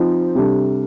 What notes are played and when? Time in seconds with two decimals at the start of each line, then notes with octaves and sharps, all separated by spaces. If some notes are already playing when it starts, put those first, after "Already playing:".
Already playing: F3 C4 D#4
0.35 C3 G3 D4 A4